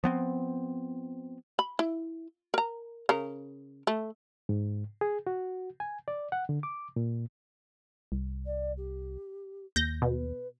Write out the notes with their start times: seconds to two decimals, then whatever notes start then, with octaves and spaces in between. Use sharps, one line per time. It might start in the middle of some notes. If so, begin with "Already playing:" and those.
0.04 F3 B3 C4
1.59 B5
1.79 E4
2.54 A#4 A#5
3.09 C#3 A#4
3.87 A3
4.49 G#2
5.01 G#4
5.27 F#4
5.80 G#5
6.08 D5
6.32 F#5
6.49 D3
6.63 D6
6.96 A#2
8.12 C2
8.45 D5
8.77 G4
9.76 D#2 G6 A#6
10.02 B2 B4